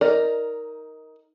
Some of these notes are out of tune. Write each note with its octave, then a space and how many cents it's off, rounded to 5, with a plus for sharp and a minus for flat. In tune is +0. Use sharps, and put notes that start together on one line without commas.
D#4 +15 A#4 +0 D5 +0